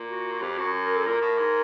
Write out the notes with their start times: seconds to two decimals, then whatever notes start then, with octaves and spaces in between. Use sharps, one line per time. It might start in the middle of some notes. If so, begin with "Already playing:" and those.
Already playing: A#2
0.10 F#4
0.32 F#4
0.42 F2 G4
0.58 F#2 F#4
0.74 F#4
0.85 A#4
0.96 A4
1.06 A#2 A#4
1.22 A2
1.38 G#2